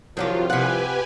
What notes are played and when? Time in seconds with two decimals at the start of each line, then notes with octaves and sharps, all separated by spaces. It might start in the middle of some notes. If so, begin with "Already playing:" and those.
0.17 C2 D#3 F3 F#3 F4 G4
0.50 C3 G4 B4 F#5 G#5